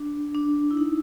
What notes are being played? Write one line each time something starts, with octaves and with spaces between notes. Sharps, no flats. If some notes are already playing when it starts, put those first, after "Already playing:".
Already playing: D4
D4
E4
D#4